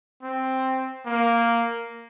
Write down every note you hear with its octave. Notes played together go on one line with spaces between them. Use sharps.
C4
A#3